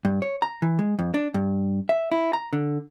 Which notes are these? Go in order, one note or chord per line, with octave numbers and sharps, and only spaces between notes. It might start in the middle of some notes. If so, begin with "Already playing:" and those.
G2
C#5
A#5
E3
G#3
F2
D4
G2
E5
E4
A#5
D3